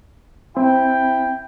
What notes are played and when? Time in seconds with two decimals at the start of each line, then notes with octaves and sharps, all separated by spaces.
0.57 C4 E4 G5